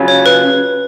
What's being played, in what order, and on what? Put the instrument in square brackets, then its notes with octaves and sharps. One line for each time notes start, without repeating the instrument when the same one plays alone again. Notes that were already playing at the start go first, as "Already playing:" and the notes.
Already playing: [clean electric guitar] C#3 F#3 C#4 F4
[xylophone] C#5
B4